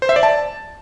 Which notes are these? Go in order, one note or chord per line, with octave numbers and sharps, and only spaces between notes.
C5
E5
D5
A5